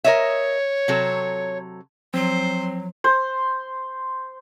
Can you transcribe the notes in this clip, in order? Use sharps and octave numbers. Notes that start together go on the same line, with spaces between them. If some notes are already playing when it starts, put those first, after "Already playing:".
A#4 C#5 D#5 E5
C3 F#3 A4
F3 F#3 C4 C5
C5